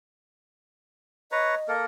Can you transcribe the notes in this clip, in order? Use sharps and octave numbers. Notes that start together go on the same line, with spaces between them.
B4 C#5 D#5 A#5
A#3 A4 A#4